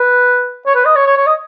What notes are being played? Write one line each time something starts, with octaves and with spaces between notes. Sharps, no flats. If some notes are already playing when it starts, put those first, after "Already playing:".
Already playing: B4
C#5
B4
D#5
C#5
C#5
C#5
D#5